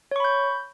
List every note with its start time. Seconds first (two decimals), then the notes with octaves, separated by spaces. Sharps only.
0.11 C#5
0.16 C#6
0.20 B5
0.24 G6